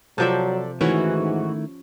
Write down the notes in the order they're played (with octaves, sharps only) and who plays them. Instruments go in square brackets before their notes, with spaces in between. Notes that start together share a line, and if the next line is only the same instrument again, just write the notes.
[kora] C3 F3 E5 [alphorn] F#3 [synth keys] A4 D5
[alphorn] G#2 [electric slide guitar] D#3 A3 E4 [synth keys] E3 F#4 [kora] C#4